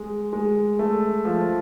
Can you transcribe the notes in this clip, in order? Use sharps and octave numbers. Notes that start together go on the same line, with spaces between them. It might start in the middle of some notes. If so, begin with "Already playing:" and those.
Already playing: G#3
G#3
A3
F3